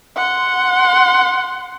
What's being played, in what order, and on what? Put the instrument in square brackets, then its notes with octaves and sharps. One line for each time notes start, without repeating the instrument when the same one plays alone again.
[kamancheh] F#5 C6